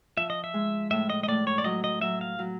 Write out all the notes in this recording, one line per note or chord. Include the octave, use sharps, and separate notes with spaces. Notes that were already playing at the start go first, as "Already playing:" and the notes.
F3 E5
D#5
E5
G#3
A2 E5
D#5
D#5
A2 D5
C#5
D5
F#3 D#5
D#5
F#3 E5
F5
F#3